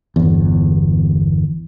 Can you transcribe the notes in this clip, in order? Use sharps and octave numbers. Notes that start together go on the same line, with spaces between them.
G1 E2